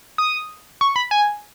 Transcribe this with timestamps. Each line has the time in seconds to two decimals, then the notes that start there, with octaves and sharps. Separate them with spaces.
0.18 D#6
0.81 C#6
0.96 B5
1.11 G#5